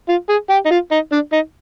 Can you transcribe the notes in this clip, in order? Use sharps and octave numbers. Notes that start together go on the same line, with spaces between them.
F4
G#4
G4
D#4
F4
D#4
D4
D#4